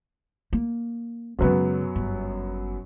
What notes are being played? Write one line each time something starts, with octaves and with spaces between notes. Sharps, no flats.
A#3
F#2 C#3 F#3 G#3 B3
G1